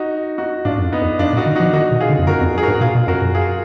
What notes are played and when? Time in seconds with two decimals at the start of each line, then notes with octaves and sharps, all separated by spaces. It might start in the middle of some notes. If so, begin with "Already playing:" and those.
Already playing: D#4 F#4
0.38 D#4 F#4
0.65 G#2 D4 F4
0.78 F#2
0.84 F2
0.92 B3 D#4
1.01 F2
1.19 F#2 D4 F4
1.33 A#2
1.37 D#4 F#4
1.46 D#3
1.55 D#4 F#4
1.60 F3
1.73 D#3 D#4 F#4
1.91 B2
2.01 F4 G#4
2.10 D3
2.19 F2
2.27 F#2 F#4 A#4
2.41 F2
2.54 F#2
2.58 G#4
2.63 F#4 A#4
2.68 G#2
2.81 B2 F4 G#4
2.95 B2
3.08 F#2 F#4 A#4
3.22 F#2
3.35 F4 G#4